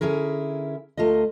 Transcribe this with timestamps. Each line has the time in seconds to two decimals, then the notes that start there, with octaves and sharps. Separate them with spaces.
0.01 D3 C#4 E4 G#4 A#4
0.97 D2 A3 F4 A#4 D#5